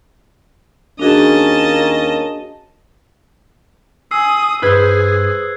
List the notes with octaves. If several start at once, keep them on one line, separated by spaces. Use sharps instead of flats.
D#2 A#3 C#4 D4 F#4 G#4 D#5 A5
G#5 D#6 E6 C7
G2 G#4 B4 C5 E6 F#6 G#6